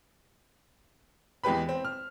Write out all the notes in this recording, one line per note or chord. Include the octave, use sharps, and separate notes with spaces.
E2 G#3 G4 B4 B5
C4
F6